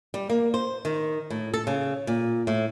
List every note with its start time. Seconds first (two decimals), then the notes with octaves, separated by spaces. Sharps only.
0.14 G3
0.30 A#3
0.54 C5
0.85 D#3
1.30 A2
1.54 A4
1.67 C#3
2.07 A#2
2.47 A2